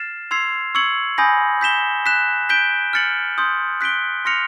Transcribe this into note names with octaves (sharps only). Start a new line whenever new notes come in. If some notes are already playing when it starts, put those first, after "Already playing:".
Already playing: F6 A6 C7 E7
C6 E6 G#6 C7 F7
C#6 E6 G#6 C#7 F#7
G#5 B5 D#6 G6 A#6
G6 B6 E7 G7
F#6 B6 E7
G6 B6 D7 G7
F6 A6 C#7 F#7
C6 D#6 G6
F#6 B6 D7 G7
C6 F6 A#6 C#7 F7